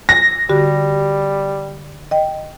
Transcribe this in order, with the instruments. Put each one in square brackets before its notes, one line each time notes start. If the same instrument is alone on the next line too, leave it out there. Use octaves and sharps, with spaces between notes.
[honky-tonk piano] A#6
[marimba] D3 F#4 G4 [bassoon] G3
[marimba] D#5 G5